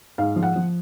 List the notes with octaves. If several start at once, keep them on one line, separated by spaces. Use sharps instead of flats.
G#2 F5
F3
F#5
F3